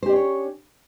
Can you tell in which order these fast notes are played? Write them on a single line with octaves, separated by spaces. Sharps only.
C5 G4 D4 C#4 C#5